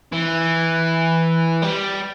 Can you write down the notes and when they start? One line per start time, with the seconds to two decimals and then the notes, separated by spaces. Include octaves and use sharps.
0.12 E3
1.62 G3